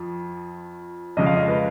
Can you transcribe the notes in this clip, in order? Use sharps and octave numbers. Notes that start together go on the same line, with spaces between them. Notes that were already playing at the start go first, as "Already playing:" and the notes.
Already playing: F2 F3
F2 C#3 G#3 D#5
F5
D#5
B4